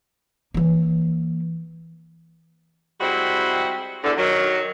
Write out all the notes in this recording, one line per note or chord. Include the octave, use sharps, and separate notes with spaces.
E3 A#3
G3 G#3 C4 E4 F#4
E2 D3
D#3 F#3